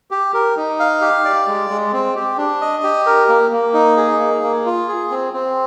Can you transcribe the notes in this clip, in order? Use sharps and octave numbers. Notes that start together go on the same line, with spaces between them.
G4
A#4
D#4
F5
G4
D5
G#3
G#3
C4
G4
D4
D#5
G4
A#4
A#3
A#3
D#4
G#4
A#3
A#3
F4
G#4
C4
C4